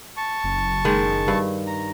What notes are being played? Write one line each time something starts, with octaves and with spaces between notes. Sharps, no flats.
A5 C#6
F#1
D#3 G#3
G2
A#5